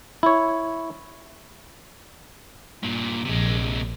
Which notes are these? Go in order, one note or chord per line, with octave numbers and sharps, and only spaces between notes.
E4 C#5
G2 A#2
A#1 C3 G#3